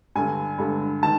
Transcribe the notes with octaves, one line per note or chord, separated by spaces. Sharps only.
G2 D3 G#5
G2 D3
D#3 A5